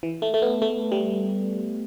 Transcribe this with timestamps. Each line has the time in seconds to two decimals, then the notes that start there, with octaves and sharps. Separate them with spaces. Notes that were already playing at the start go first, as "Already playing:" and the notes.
0.03 E3
0.22 A3
0.34 A3
0.42 B3
0.62 A3
0.92 G3